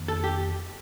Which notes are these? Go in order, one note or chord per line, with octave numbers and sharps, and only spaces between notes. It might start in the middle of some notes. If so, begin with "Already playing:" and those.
Already playing: F2 D#3 A#3 D4
A4
G4